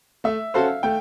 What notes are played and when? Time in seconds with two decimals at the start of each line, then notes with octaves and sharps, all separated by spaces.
0.24 A3 E5
0.54 C#4 F#4 A4 C5 F5
0.83 A3 G5